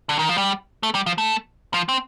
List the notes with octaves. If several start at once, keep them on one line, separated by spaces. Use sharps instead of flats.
D3
D#3
F3
G3
A3
G3
F3
A3
F3
C4